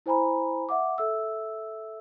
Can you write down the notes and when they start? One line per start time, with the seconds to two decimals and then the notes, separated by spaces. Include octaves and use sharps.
0.06 E4 C5 G#5 A#5 B5
0.69 E5 F#5 D6
0.98 A4 E5 E6